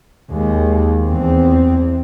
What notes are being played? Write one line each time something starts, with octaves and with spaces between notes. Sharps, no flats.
D#2 G#3
E2 C4